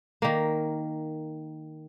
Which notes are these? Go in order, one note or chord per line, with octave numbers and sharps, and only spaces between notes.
D#3 A#3